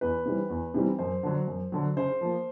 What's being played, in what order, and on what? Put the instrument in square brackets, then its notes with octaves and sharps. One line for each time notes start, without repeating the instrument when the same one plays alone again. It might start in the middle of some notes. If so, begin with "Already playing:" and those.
[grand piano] E2 B4
C3 E3 G3 C4
E2
C3 E3 G3 C4
F#2 C5
D3 F#3
F#2
D3 F#3
C#3 C5
F3 A#3